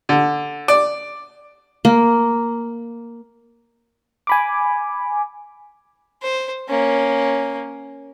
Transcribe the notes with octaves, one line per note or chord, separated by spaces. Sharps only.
D3
D5
A#3
G#5 B5 D6
C5
A#3 C#4